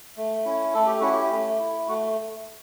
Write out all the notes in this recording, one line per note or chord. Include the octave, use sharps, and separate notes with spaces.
A3
C#4 E4
A3 A4
G4
C#4 E4 F#4
G4
A3
E4
A3 F#4